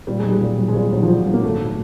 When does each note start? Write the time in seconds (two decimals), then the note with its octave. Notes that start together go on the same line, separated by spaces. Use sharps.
0.07 A#2 G3
0.19 B1 G#3
0.32 G3
0.41 A#2
0.58 B1
0.68 G#3
0.75 A#2 G3
0.92 B1 F#3
1.03 F3
1.09 A#2 F#3
1.26 B1
1.34 A#3
1.43 G#1 A3